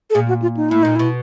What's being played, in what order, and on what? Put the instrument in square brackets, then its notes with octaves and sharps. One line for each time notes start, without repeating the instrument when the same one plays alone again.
[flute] A4
[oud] A#2 [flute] G#4
[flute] F#4
F4
D#4
[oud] A2 [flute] E4
[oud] A#2 [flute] D#4
[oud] B2 [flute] E4